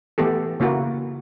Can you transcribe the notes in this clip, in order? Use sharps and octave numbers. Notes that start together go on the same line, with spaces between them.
E3 A3 B3 G4 A4
C#3 A#3 E4 F#4